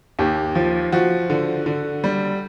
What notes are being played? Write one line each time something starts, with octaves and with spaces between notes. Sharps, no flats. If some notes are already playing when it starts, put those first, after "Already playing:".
D#2 G4
F3
F3 F#4
D3
D3
G3